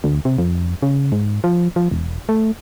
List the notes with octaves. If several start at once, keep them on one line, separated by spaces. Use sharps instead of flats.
D2
C3
F2
C#3
G#2
F3
F3
E1
A3